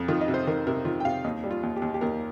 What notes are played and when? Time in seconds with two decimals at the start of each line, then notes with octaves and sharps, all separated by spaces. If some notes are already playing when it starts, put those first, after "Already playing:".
Already playing: F2
0.08 D#3 F4
0.21 D#5
0.28 C3
0.34 C5
0.47 D#3 A#4
0.67 C3 A#4
0.85 D#3 F4
1.00 G5
1.05 C3 F5
1.24 D#2 D#4
1.44 G3
1.51 F4
1.63 D#2
1.76 G4
1.82 D#2
1.94 G4
2.01 D#2 A#4